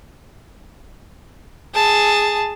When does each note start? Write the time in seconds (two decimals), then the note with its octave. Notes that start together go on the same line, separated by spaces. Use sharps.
1.74 G#4 A5